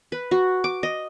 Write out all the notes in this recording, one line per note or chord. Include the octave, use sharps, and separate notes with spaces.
B4
F#4
D6
D#5